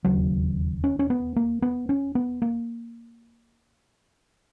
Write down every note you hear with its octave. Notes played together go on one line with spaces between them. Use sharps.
E1 D#2 C#3 F#3
C#4
C#4
B3
A#3
B3
C#4
B3
A#3